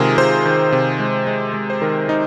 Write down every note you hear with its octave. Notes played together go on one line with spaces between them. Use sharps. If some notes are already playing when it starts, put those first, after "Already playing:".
Already playing: C3 D#3 G#3 F4 G#4 A#4
C3 C5
D#3
C3
G#3
G#3
G#3
C5
D#3 A#4
D#3 D#4